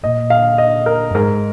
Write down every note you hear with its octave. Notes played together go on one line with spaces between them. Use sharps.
A#2 D#5
F5
D#5
A#4
F#2
G#2 A#4